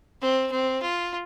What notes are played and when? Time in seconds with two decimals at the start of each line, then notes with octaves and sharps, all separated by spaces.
0.22 C4
0.51 C4
0.82 F4